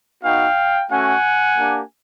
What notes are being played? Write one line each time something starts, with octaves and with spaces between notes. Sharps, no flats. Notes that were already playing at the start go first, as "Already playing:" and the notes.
B3 D#4 F#4 F5 G5
A3 C#4 F#4 F#5 G#5
A#3 D4 G4